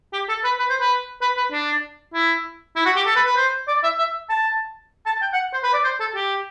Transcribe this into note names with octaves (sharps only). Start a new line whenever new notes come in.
G4
A4
B4
B4
C5
B4
B4
B4
D4
E4
E4
F#4
G4
A4
B4
B4
C5
D5
E5
E5
A5
A5
G5
F#5
C5
B4
D5
C5
A4
G4